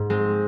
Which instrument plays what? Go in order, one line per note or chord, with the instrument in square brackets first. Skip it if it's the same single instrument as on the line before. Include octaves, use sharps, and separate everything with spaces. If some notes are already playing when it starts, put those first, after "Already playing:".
Already playing: [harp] G#2
G#3 C4